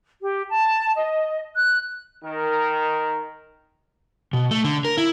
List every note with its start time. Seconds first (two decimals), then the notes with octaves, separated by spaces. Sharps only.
0.21 G4
0.49 A5
0.96 D#5
1.56 F#6
2.23 D#3 A#4
4.33 B2
4.51 A3
4.64 D3
4.85 A#4
4.97 E4